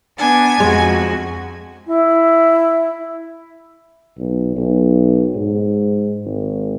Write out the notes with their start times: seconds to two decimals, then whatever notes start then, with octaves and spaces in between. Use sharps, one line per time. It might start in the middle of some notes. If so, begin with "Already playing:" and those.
0.18 B3 D4 G#5
0.60 F2 G#3 F#4
1.86 E4
4.18 B1
4.56 B1
5.35 G#2
6.25 G#1